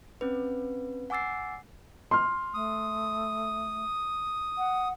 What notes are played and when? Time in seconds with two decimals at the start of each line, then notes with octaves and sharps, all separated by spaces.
0.21 C4 C#4 B4
1.10 F#5 G#5 D6 E6 A6 C7
2.11 C6 F6
2.54 A3 D#6
4.58 F#5